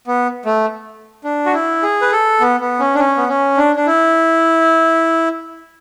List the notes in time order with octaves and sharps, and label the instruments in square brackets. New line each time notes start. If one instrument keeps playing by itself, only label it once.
[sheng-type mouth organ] B3
A3
D4
F#4
E4
G#4
B4
A4
B3
B3
C#4
D4
C#4
B3
C#4
D4
D4
E4